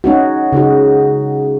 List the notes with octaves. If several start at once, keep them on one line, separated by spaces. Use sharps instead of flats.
C#4 D#4 F#4
C#3 D#4 F#4